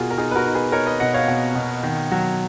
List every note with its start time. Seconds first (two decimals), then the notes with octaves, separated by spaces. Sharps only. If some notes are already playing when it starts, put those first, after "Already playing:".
Already playing: B2 A#3 F4 F#4 G#4 A#4
0.10 A#4
0.18 D#4 F4 G#4
0.31 B4
0.36 F#4 A#4
0.46 D#4
0.54 G#4 B4
0.72 D#4 A#4 C#5
0.87 B4 D#5
1.00 B2 D#5 F#5
1.14 C#5 F5
1.28 B2
1.55 B2
1.83 D#3
2.11 F#3